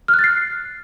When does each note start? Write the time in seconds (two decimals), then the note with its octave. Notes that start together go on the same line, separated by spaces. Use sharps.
0.08 F6
0.14 F#6
0.19 A6
0.24 C7